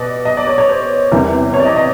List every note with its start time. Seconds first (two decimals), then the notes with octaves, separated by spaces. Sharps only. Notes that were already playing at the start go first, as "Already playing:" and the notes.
Already playing: B2 B3 D5 D#5
0.25 D#5
0.37 D5
0.47 C#5
0.58 C#5
0.69 C5
1.12 E2 C3 D#3 G3
1.54 C#5
1.60 D5
1.65 D#5
1.76 D#5